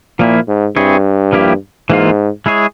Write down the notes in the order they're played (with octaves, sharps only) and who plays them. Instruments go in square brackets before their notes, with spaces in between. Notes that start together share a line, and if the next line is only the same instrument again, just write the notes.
[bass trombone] A#2 [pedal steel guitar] F3 A#3 E4
[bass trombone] G#2
[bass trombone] G2 [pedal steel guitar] C4 E4 G#4 C#5
[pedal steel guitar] F3 A#3 E4 G4
[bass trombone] G#2 [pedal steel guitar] E3 A#3 F4
[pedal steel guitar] G#3 E4 G#4 C#5